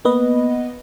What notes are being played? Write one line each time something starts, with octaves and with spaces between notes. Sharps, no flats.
A#3 B3 B4 D#5